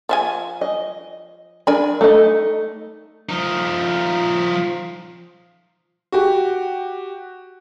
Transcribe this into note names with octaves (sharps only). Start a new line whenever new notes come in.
F3 E5 G#5
D#5
D4 A#4 G#5 B5
A3 D#4 D#5
F3 D#4
F#4 G4